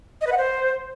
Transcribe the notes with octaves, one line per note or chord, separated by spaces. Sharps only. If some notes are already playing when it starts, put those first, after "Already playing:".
D#5
B4
F#5
C5